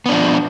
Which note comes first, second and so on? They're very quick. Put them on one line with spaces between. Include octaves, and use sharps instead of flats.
B3 D4 F3